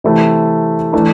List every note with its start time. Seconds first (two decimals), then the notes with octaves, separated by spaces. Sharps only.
0.04 C3 E3 A3 C4 E4
0.93 E3 A3 D4